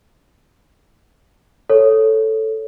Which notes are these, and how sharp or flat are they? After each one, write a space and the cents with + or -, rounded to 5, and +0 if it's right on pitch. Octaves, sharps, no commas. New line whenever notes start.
A4 +0 C#5 +0